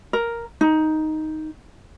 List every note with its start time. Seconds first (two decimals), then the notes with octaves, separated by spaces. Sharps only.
0.13 A#4
0.61 D#4